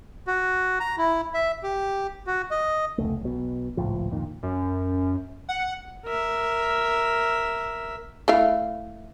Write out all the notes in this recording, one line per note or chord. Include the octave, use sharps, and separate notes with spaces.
F#4
A#5
E4
E5
G4
F#4
D#5
F1 C#2 A3
B1 B2
G#1 C#2 A2 F3
F2 A#2 D#3
F#2
F#5
A#4 E5
A3 E4 F5